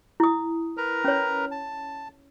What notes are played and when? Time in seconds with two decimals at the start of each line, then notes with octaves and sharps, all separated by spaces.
0.20 E4 D#6
0.77 A#4 B4 A#5
1.04 C#4 C#5
1.51 A5